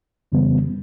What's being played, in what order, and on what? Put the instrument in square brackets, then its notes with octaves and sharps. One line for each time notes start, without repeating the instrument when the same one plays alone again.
[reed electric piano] F2 C#3 E3 G3 B3